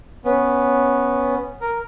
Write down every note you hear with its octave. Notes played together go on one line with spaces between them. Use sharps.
B3 C#4
A#4